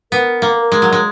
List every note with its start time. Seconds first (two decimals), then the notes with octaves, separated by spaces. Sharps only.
0.12 B3 A#4
0.42 A#3
0.56 A#4
0.72 G#3
0.82 F#3
0.93 G#3